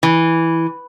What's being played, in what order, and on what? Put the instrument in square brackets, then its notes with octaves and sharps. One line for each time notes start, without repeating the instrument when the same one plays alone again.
[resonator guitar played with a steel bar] E3